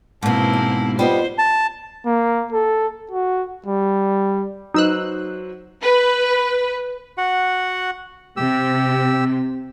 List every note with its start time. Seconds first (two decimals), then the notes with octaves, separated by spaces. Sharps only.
0.23 G#2 B2 A#3 C4 E4 A5
0.53 E2
0.99 G3 B3 F4 C5 D#5
1.38 A5
2.06 A#3
2.53 A4
3.11 F#4
3.66 G3
4.74 F#3 D#4 B4 C5 E6 F#6
5.82 B4
7.18 F#4 F#5
8.37 C3 G4 E6